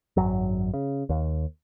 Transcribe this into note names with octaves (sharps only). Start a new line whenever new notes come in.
G#1 F#2 F#3
C#3
D#2